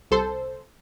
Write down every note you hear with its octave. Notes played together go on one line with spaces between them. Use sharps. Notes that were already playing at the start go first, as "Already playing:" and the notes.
C2 A4 C5